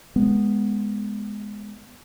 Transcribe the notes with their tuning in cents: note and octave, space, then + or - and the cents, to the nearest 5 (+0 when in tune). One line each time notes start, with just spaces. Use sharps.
G#3 +0 B3 +0